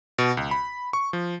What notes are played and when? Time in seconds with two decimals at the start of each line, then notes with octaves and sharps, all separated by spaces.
0.18 B2
0.37 C#2
0.51 B5
0.93 C#6
1.13 F3